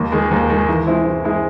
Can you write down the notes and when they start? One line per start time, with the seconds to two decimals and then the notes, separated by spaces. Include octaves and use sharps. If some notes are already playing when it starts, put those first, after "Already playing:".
Already playing: D#2
0.12 D#3 G#3
0.31 D#2
0.50 D#3 G#3
0.69 E3
0.87 G#3 C4 E4
1.06 E3
1.25 G#3 C4 E4